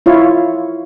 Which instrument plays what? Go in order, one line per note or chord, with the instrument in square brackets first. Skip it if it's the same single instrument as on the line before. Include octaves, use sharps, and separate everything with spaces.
[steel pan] E4 F4 C#5